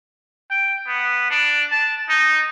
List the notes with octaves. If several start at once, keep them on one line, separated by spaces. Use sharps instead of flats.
G5
B3
D4
A5
D#4